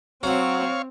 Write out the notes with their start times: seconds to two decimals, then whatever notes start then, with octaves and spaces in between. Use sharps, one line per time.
0.23 F#3 C4 F#4 C#5 F5 F#5